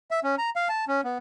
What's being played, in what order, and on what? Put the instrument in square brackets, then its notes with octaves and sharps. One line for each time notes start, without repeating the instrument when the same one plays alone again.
[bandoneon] E5
C#4
A#5
F5
A5
C#4
B3